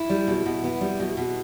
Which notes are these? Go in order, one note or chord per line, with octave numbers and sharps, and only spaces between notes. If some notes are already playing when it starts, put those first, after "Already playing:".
Already playing: E4
G3
B2
B2
B3
G3
B2
B2